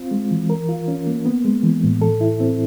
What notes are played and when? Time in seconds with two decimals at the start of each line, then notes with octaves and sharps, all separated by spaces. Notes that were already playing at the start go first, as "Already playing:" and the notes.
Already playing: C4 F4
0.11 G#3
0.31 E3
0.50 A#4
0.69 F4
0.88 C#4
1.07 A#3
1.26 B3
1.44 G#3
1.63 E3
1.84 A2
2.01 A4
2.21 E4
2.40 C4